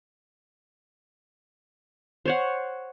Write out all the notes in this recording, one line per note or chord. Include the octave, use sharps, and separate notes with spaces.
C5 C#5 F#5